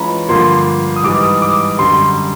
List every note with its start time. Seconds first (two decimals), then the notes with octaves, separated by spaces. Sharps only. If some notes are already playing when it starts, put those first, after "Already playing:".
Already playing: E3 G#3 C#4 F4 A#5 B5
0.29 G2 D3 F3 A#3 C6
0.96 D#6
1.03 G#2 E3 G3 D6
1.23 D#6
1.42 D6
1.78 F#2 D3 G3 C6